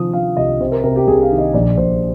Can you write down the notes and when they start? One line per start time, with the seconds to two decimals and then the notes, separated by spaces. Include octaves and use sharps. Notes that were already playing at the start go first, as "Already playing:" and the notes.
Already playing: C3 D#3 F3 D#6
0.13 F3 F5
0.37 C2 D#5
0.60 C3 C5
0.72 A#4
0.84 C3 A#4
0.96 G4
1.07 C2 G#4
1.23 F5
1.31 D#3
1.38 D#5
1.54 A#1 D5
1.77 A#1 C5